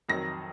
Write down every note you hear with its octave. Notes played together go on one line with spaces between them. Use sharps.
F2 D#3 F#3 A#6